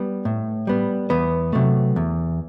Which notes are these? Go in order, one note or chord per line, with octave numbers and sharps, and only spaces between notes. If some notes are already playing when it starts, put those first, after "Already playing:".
Already playing: G3 B3
A2
G3 B3
E2 B3
C3 F#3 A3
E2